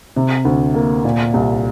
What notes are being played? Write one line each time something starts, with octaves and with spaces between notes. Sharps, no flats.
C3
D2
A#3
A#2
C2